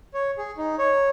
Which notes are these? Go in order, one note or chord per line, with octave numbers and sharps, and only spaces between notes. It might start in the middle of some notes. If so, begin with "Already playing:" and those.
C#5
G#4
D#4
C#5